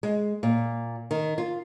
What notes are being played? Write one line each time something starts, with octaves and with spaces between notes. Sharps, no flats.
G#3
A#2
D#3
F4